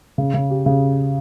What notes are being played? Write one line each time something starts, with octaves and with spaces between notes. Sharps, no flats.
C#3
C#3
G4
C#3